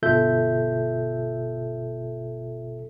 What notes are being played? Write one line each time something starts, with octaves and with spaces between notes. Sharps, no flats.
G1 B2 F4 A4 E5 G6